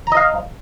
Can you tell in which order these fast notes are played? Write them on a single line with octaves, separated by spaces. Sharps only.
A#5 D#5 F5